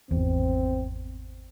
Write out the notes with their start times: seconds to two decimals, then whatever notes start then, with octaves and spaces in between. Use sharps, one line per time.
0.11 G#1 E2 C4